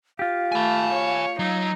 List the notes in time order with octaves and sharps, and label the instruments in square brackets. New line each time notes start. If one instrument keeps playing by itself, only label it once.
[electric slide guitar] F4 G4 [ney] F5
[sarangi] A3 [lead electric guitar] G#5 B5
[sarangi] C#5
[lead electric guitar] F#3 [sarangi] D#4